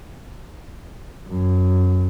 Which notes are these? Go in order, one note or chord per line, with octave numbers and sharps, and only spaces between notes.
F#2